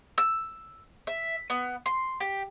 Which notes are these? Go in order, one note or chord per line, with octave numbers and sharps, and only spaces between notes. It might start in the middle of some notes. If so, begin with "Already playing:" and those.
E6
E5
B3
C6
G4